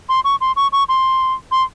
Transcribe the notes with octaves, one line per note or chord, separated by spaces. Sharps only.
C6
C#6
C6
C#6
C#6
C6
C6